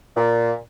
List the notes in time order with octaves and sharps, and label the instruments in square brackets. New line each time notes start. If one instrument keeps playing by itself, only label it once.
[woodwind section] A#2